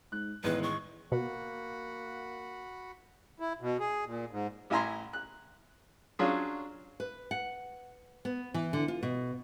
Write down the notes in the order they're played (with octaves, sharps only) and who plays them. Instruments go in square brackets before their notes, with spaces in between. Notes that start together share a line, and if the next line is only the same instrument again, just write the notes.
[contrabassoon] G#2 [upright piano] F#6
[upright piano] A1 D#3 G#3 [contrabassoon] E2 [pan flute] B4
[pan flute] C#6
[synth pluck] B2 [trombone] A#3 [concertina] F#4 F#5 B5
[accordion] E4
B2
G#4
A#2
G#2
[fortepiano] A1 E4 G#5 A#5 C6
F#6
F#3 C#4 D4 F4 G#4
[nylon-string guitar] B4
F#5
B3
E3
D3
F4
B2